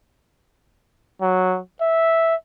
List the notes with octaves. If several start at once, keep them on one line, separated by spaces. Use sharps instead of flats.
F#3
E5